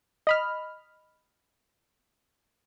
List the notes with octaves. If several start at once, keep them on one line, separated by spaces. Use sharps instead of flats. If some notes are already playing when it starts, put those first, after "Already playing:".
D#5 B5 F6